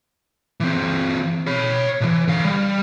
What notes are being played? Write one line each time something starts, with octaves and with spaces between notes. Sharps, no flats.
E3 C4
C#5 B5
B1 E3
D3 F5
G3